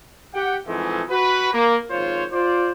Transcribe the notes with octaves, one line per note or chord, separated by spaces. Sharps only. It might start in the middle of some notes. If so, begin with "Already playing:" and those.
G4 F#5 G5
F2 G#2 E3 G#3 A3
F#4 B4
A#3
G#1 F3 F4 C5 C#5
F4 C5 D5